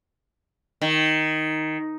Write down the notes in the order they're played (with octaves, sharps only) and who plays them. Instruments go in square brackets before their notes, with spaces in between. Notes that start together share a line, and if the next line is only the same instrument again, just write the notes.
[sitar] D#3